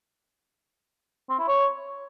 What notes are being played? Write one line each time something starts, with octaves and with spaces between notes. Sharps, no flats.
C4
E4
C#5